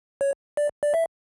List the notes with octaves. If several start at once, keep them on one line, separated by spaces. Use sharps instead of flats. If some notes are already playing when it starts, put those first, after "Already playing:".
C#5
D5
D5
E5